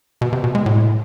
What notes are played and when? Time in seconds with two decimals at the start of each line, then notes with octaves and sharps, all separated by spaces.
0.21 B2
0.33 C3
0.44 B2
0.55 G#3
0.66 A2